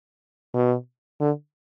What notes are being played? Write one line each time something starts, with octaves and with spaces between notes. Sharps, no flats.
B2
D3